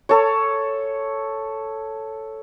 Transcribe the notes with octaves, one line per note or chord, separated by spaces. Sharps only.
A4 C#5